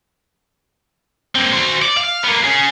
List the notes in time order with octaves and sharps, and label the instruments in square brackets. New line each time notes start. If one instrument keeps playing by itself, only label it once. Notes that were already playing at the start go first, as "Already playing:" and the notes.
[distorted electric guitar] A#3 C4
F#4 C5
D5
F5
A#3 B3
C#4 G#4